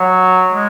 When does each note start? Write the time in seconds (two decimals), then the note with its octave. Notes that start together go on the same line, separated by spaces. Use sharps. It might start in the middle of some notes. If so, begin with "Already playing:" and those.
Already playing: F#3
0.53 G#3